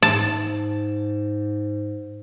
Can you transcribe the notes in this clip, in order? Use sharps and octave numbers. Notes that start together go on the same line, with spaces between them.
G#2 A5